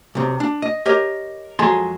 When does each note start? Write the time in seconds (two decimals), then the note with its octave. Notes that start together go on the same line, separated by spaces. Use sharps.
0.15 B1 C3
0.40 D4
0.62 D#5
0.86 G4 A#4 C#5 D#5
1.59 F2 F#3 G#3 G#4 A4 C6